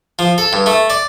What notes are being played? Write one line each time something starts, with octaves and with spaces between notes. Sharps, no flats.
F3
A4
G2
A3
D5